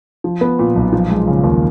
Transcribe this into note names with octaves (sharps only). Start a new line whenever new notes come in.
F3
B3
A#2
B1
F3
G#3
C#3
D#2